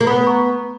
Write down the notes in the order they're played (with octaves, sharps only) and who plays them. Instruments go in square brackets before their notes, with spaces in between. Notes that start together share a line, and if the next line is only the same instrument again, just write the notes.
[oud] A#3
[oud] B3 [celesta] B5 D#6
[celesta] A#5 C#6